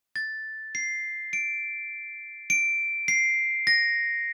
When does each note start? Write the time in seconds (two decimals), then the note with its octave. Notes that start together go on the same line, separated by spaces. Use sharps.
0.16 A6
0.75 C7
1.33 D7
2.50 D7
3.08 C7
3.67 A#6